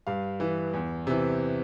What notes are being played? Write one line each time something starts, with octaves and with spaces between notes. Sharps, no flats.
G2 F5
E3
E2
C3 E3